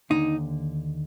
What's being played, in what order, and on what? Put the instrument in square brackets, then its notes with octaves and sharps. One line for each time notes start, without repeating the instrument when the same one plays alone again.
[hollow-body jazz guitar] D#2 D3 D#4